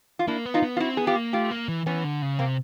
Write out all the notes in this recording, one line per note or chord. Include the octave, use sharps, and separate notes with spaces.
F4
A#3 D4 E4
B3
D#4 F4
B3
F4
C4 E4 F#4
B3 G#4
F4 G4
A#3
A3 F4 G4
A#3
E3
E3 B3 C#4
D3
C#3
C3 A#3 C4